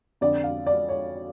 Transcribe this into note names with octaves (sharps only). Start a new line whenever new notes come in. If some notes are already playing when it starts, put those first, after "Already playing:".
F2 D3 D5
F5
D5
C#5